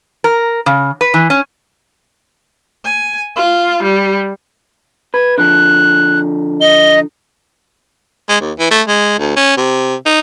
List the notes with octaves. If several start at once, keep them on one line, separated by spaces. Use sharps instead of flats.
A#4
C#3
B4
E3
C#4
G#5
F4
G3
B4 G#6
D3 F3 F#6
D#5 G7
G#3
D#2
E3
A3
G#3
D2
C#4
C3
D#4